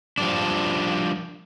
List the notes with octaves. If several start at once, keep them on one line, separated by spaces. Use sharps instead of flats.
F3 G3 D4